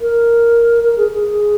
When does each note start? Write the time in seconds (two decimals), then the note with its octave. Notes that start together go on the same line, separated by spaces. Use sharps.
0.01 A#4
0.84 A#4
0.97 G#4
1.11 G#4